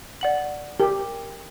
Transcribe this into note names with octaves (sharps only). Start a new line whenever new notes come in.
D5 F#5 F#7
G4 A#4